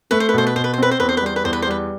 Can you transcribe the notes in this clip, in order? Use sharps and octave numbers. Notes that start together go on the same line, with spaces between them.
A3 B4
C5
B4
B2 C5
B4
B2 C5
B4
C5
C4 B4
C5
E2 B4
C5
B4
G3 C5
B4
E2 C5
B4
C5
G3 B4